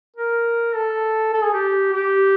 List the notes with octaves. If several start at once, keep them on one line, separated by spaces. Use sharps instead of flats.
A#4
A4
A4
G#4
G4
G4